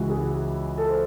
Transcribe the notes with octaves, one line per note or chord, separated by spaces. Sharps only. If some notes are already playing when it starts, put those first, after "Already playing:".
Already playing: C#2 C#3 E3 E4 F#4
G#4
A4
C5